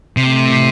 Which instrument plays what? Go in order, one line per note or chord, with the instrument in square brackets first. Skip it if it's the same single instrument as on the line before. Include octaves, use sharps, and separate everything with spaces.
[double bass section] A2 E3 A3 C4 [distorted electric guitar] C3